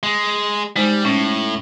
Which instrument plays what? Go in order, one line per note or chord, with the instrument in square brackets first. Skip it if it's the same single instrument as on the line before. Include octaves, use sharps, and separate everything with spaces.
[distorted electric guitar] G#3
[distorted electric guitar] G3 [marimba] G#3 D#4 C5
[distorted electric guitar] A2 [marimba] C#4